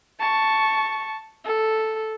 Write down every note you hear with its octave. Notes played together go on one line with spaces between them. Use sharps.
A5 C#6
A4